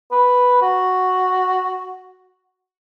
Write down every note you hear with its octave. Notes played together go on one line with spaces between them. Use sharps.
B4
F#4